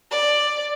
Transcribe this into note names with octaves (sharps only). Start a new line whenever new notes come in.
D5